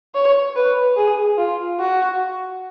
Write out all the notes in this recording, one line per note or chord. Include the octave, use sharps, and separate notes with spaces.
C#5
B4
G#4
F4
F#4